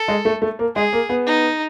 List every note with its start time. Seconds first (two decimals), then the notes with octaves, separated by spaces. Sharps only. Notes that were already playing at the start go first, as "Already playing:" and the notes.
Already playing: A4
0.08 G#3
0.25 A3
0.42 A3
0.59 A#3
0.75 G#3 G#4
0.93 A#3
1.09 B3
1.26 D#4